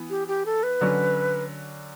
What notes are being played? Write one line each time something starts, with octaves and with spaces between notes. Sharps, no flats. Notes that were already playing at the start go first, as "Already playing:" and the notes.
Already playing: E3 B3
G4
G4
A4
B4
D3 F#3 C#4